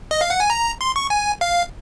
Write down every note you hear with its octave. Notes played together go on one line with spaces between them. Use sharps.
D#5
F5
F#5
G#5
A#5
C6
C#6
G#5
F5